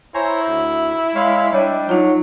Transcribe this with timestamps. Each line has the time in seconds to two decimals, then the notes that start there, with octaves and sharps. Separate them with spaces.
0.15 E4 C5 C#5 G#5 A#5
0.47 D2
1.15 G#3 C#5 F5 B5
1.53 G3 D4 C#5 D#5
1.89 F#3 D#4 F4